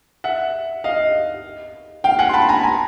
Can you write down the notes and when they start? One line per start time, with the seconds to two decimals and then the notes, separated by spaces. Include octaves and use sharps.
0.24 E5 F#5
0.84 D#5 F5
2.04 F5 G5
2.19 F#5 G#5
2.29 C6
2.33 A5 B5
2.49 G#5 A#5
2.63 G#5 A#5